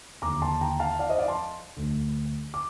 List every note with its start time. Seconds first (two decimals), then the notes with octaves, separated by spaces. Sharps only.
0.22 D#2 D3 A#5 D6
0.42 A5 C6
0.61 G5 A#5
0.80 F5 A5
0.99 D5 F5
1.09 C5 D#5
1.18 D5 F5
1.28 A5 C6
1.77 D2 D3
2.54 D6